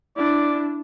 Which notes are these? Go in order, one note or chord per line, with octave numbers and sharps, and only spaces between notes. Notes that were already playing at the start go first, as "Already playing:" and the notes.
D4 E4 D5